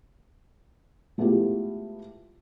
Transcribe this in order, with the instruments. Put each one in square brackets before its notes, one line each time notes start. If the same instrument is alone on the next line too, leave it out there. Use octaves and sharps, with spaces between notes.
[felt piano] G#3 A3 B3 E4 F4 G4